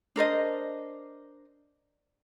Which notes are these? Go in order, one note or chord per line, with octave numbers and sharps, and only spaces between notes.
D4 A#4 C5 D#5